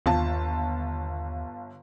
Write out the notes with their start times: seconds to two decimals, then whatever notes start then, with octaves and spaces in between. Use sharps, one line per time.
0.06 G1 D#2 F4 A5